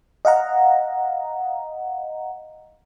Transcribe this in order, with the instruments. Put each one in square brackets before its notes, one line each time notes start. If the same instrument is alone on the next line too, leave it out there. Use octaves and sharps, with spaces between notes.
[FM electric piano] D#5 F5 F#5 A#5